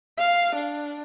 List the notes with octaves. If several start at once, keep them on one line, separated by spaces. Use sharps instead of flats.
F5
D4